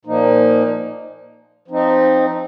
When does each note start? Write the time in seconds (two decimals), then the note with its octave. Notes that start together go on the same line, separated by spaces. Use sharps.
0.05 A#2 F3 A#3 D#4
1.68 F3 C4 D#4